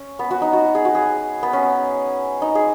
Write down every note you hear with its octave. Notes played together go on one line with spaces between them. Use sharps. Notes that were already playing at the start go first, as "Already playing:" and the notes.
Already playing: C#4
B3
F#4
D#4
F#4
G#4
F#4
G#4
B3
C#4
D#4
G#4